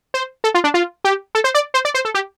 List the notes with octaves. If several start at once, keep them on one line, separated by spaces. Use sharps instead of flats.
C5
A4
F4
D4
F4
G4
A4
C5
D5
C5
D5
C5
A4
G4